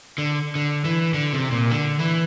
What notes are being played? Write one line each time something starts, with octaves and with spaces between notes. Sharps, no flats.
D3
D3
E3
D3
C3
A#2
D3
E3